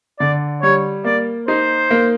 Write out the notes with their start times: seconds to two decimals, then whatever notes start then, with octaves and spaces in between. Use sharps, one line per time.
0.19 D3 D5
0.62 G3 C#5
1.04 A#3 D5
1.48 D#4 C5
1.91 A#3